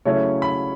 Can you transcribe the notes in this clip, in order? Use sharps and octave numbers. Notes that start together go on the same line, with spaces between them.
C#3 F#3 A3 C#4 E4 C#5
B5